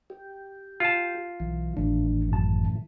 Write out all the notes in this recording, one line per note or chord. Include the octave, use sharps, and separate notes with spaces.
G4
F4 A5
B1 E3
G#1 A2 E3 D4
F#2 A5